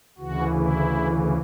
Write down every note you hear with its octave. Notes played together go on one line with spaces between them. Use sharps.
D2 C#3 E3 F#4
E4